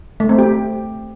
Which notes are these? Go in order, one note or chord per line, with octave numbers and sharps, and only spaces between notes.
A3
C4
G4